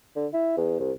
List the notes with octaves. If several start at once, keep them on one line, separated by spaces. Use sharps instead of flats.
D3
E4
E2
C2